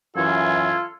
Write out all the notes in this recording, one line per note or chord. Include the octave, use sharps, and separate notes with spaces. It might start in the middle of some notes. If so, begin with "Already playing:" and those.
F#2 E3 F4 A4 G#6